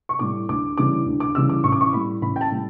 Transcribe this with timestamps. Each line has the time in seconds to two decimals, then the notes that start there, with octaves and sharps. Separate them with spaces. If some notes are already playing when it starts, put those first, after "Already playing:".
0.09 C#6
0.19 A2 G3 D6
0.49 D2 D6
0.78 C#3 E3 G3 D6
1.06 D2
1.20 D6
1.35 C#3 E3 G3 E6
1.49 D6
1.64 A1 C#6
1.72 D6
1.81 C#6
1.93 A2 G3 B5
2.21 A1 B5
2.36 G5
2.41 A5
2.51 A2 G3